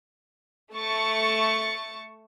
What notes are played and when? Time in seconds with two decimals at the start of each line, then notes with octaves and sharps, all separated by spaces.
0.73 A3 A5 C#6 A6 C#7